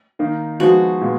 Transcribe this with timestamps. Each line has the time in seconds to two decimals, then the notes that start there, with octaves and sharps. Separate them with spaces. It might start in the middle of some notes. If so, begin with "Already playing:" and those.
0.19 D#3 A#3 D#4
0.60 F3 G#3 B3 D#4 F#4
1.01 A#2 G#3 B3